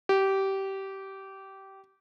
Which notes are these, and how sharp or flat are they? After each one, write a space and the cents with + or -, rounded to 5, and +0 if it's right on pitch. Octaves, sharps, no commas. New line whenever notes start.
G4 -20